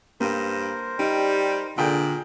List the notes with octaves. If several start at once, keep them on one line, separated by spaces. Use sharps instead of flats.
G2 A#3 A#4 C5
G3 D#4 G4 D5 G5
A#2 D3 G#4 G5 D#6 F#6